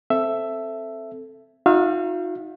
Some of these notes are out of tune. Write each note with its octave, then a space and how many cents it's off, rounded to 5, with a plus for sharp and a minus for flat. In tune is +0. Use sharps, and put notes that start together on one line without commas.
C4 +5 A4 +0 E5 +10
D#4 +20 F#4 -45 F5 -35